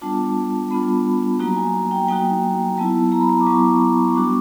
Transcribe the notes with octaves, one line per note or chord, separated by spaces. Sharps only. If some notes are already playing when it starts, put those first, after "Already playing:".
G3 B3 D4 F4 A5
G3 B3 D4 F4 B5
F#3 A#3 D#4 F#4 A#5
G#5
G5
F#3 A#3 D#4 F#4 G5
F#3 B3 E4 A5
A#5
B5
A#5
D6
F#3 B3 E4 C#6
C#6
G3 B3 D4 F#4 D6